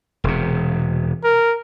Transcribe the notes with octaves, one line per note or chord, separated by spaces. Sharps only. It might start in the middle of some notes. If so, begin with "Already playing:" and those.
E1 C3
A#4